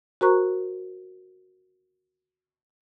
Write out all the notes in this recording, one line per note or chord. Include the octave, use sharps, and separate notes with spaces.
F#4 A#4 C5 A#5 C#6 F#6